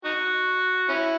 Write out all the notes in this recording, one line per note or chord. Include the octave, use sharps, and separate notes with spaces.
D#4 F#4
C#4 E4